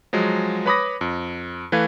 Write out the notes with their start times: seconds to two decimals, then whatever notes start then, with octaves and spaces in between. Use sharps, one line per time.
0.13 F3 F#3 G#3
0.66 B4 C#5 B5 D6 D#6 A#6
1.01 F2
1.72 E3 A3 B4 F5 G#6